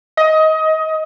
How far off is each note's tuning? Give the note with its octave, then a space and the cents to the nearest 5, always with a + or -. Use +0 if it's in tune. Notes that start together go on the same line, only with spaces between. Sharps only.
D#5 +25